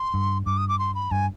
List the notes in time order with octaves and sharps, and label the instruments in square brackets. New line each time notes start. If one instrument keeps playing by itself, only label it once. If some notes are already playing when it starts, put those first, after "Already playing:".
Already playing: [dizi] C6
[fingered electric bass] G2
[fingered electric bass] G2 [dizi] D6
[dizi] D#6
D6
C6
B5
[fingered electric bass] G2 [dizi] G#5